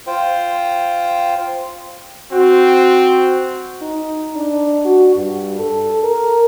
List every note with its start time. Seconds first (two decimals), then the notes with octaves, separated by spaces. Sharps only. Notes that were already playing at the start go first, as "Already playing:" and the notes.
0.07 F4 C5 G5
2.32 C4 F#4
3.82 D#4
4.36 D4
4.85 F#4
5.16 G2
5.59 A4
6.04 A#4